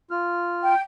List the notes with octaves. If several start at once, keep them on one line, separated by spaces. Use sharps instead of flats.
F4 F6
G5